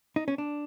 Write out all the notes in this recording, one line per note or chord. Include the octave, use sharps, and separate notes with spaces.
D#4
C#4
D4